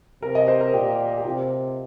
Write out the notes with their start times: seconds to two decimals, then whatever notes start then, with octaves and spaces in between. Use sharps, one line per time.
0.22 C3 A#4
0.35 D#5
0.48 C5
0.61 A#4
0.73 A#2 G4
1.18 G4
1.25 C3 F4